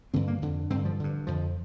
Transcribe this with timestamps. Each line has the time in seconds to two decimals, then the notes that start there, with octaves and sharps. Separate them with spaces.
0.14 G2 D3 C4
0.28 A#3
0.42 F2 D3
0.70 G2 C4
0.73 D3
0.85 F3
1.00 G2 D3
1.27 F2 D3 F3